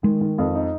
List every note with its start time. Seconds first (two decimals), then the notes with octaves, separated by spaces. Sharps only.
0.03 D#3 G#3
0.21 D#3
0.38 F2
0.55 D#4